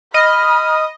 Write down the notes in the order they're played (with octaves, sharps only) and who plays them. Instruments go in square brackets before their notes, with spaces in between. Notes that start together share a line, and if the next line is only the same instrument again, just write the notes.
[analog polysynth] D#5 [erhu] B5 [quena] F6